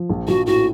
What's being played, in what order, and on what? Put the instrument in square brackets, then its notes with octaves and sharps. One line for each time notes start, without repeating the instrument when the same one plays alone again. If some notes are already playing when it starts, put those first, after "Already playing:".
Already playing: [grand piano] F3
A#1
[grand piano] A#1 [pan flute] F#4
[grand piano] A2 [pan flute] F#4